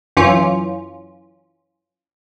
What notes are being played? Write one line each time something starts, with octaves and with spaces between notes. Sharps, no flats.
F#2 E3 C#4 F4